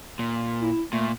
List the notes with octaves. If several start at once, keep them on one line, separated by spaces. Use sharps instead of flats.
A#2
E4
A#2 A3